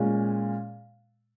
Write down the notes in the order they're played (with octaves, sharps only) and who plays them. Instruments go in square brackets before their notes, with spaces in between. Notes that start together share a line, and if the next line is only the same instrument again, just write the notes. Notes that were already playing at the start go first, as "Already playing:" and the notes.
Already playing: [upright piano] A#2 G#3 C#4